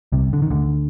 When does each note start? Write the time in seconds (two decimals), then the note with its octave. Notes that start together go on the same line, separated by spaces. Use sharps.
0.12 C2 C3
0.33 D3
0.42 D#3
0.50 D2 D3